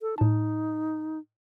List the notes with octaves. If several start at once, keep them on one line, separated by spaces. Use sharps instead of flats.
A4
A2 D#4 A5